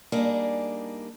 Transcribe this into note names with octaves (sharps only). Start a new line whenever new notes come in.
G3 A#3 D4 D#4 G#4